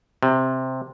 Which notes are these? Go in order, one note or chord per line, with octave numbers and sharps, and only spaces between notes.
C3